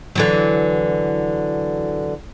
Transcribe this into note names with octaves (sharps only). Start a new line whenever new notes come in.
D3 E3 F#3